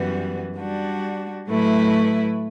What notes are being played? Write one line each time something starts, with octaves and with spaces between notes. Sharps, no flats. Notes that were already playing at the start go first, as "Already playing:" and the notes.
Already playing: F#2 E3 G3 B3 F#4
G3 D4 F#4
A2 F#3 A3 E4 B4